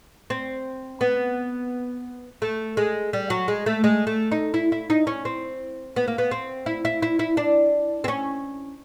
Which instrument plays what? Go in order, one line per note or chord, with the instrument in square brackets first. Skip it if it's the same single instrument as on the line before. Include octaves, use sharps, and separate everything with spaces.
[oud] C4
B3
A3
G#3
G3
F#3
G#3
A3
G#3
A3
D#4
E4
E4
D#4
C#4
C4
B3
A#3
B3
C4
E4
E4
E4
E4
D4
C4
C#4